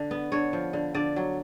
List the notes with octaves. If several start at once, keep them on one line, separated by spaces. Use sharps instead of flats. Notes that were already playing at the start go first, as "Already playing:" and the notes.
Already playing: D3 D4
B3
D3 C#5
F3
D3
D3 D5
F#3